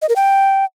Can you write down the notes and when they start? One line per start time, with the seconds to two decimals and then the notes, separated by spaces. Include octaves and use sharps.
0.02 D#5
0.09 A#4
0.16 G5